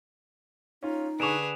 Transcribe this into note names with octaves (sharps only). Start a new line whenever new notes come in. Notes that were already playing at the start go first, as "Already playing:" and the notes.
C#4 D#4 F4
D3 G#4 B4 C#6 D7 E7 F7